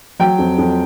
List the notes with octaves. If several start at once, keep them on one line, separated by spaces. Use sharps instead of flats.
F#3 G5
F2
F2